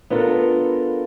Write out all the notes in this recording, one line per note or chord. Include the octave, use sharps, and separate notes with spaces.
B3 D4 F4 A4 A#4